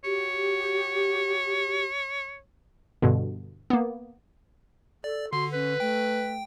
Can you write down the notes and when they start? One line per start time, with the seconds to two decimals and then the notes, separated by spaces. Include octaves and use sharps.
0.04 F#4 G4 C#5
3.02 G2 B2 D3
3.70 A#3 B3
5.04 A4 D5
5.33 D3 F#4 C6
5.53 C#4 B4
5.80 A3 G5